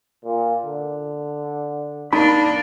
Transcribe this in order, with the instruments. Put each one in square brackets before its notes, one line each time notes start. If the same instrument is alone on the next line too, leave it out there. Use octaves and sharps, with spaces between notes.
[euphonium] A#2
D3
[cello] A#3 D4 [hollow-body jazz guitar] D#4 B5